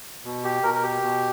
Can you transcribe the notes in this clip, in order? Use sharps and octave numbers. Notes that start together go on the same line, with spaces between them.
B2
G4
B2 A#4
A#4
G4
B2